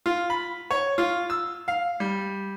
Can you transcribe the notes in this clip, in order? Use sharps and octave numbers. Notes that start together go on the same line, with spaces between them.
F4
B5
C#5
F4
E6
F5
G3